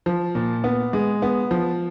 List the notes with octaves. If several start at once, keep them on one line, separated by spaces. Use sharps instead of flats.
F3
A#2
B3
G#3
B3
F3